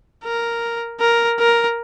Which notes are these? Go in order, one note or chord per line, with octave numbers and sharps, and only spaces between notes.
A#4
A#4
A#4